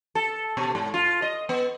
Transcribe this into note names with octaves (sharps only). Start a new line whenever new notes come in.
A4
B2
G#2
F4
D#5
B3